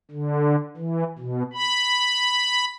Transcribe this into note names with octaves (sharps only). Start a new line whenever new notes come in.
D3
E3
B2
B5